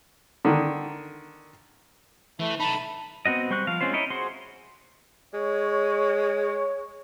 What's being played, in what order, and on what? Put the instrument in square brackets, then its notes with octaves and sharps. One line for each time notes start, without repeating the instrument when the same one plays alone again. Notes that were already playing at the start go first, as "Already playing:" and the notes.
[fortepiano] D3 D#3
[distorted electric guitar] E3 [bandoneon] A3
[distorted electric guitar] D#4 A4 [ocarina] A5 [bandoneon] B5
[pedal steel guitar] B3 C4 F#4 D#5
G3 C5 C#6 F#6
F3 F5
G#3 C4 C#4 F4 C5
D#4 E4 C#5 D#5
F#4 G#4 C5 C6
[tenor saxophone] G#3 [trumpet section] C#5